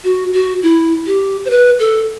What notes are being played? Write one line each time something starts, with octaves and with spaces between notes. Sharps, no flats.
F#4
F#4
E4
G4
C5
B4
A4